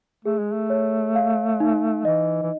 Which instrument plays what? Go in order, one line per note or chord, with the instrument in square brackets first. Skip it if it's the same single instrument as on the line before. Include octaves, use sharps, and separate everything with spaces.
[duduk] A3 [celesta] G#4
[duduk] G#3
A3
[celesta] C#5
F5
D#4
[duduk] E3 [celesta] D#5
[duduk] E3